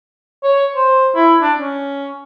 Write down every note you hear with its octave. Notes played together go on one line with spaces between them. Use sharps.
C#5
C5
E4
D4
C#4